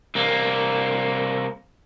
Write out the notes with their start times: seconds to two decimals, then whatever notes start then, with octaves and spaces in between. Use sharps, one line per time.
0.15 C2 A#3